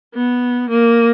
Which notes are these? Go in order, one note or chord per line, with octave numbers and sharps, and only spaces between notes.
B3
A#3